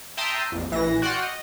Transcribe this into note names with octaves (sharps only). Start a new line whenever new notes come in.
E5 G5 A5 A#5 C6 D#6
A#1 F2
A#1 E3 A#6
F#4 D5 F#5 G5 C6 F6
D#5